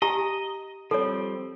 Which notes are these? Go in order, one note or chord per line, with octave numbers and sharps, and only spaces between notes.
G4 D#5 G#5 A#5
F3 G3 C4 A4 C#5